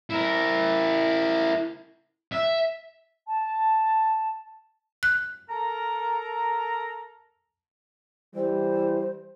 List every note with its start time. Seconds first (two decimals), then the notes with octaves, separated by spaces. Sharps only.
0.10 E4 A#4
2.32 E5
3.27 A5
5.03 F#6
5.49 A4 A#4 A#5
8.35 E3 G3 C5